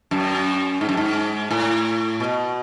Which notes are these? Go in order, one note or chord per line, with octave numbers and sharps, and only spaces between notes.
F#2
G#2
F#2
G#2
A2
B2